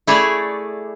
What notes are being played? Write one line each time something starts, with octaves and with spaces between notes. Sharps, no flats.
A3 E4 G#4 C#5 D5